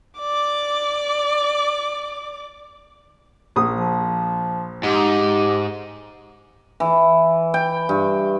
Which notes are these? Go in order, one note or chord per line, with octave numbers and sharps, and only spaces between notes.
D5 D6
A#1 D#6
F3
G#2 G4
E3
G5
G2